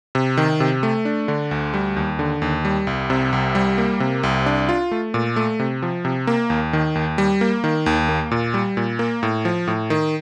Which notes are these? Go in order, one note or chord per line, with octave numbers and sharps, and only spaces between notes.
C3
D#3
C3
A3
D4
D3
D2
G3
D#2
D3
D#2
G3
C2
C3
C2
G3
A#3
C3
C2
D4
F4
A3
A#2
A3
C3
F3
C3
A#3
D#2
D#3
D#2
G3
A#3
D#3
D#2
A#3
A#2
G3
A#2
A#3
A2
F3
A2
D#3